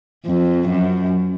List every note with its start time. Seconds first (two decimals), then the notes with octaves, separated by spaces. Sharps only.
0.25 F2
0.68 F#2